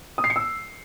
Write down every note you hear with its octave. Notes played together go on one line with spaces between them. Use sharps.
D#6
C7
C#7
E6